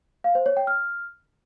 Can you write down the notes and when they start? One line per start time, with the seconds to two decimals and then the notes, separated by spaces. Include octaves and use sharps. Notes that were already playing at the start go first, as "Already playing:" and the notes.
0.24 F5
0.35 C5
0.46 C#5
0.57 G5
0.67 F6